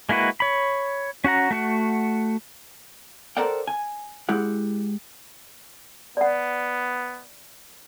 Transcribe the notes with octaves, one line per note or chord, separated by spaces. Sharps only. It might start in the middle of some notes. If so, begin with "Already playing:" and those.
G#3 A#3 E4 F#4 B4
C#5 B5
C#4 F#4 F#5 A#5
A3 F#4 F#5
A4 A#4 C5 D5 F#5 G5
G#5
G#3 E4 G4 F#5
B3 D5 F#5